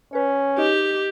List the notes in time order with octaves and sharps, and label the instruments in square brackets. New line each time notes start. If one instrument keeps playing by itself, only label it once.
[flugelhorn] C#4 [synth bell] B4 C#5
[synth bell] D#4 D#5 [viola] G4